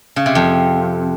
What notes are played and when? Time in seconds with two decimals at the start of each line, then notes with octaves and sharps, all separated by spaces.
0.16 C#3
0.26 C3
0.35 F2